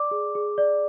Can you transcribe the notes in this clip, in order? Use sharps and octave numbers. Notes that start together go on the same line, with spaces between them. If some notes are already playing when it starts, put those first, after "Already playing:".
Already playing: D5 D6
G#4
G#4
D5